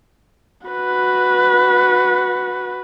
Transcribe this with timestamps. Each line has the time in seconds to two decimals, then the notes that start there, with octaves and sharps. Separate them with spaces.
0.68 F#4 B4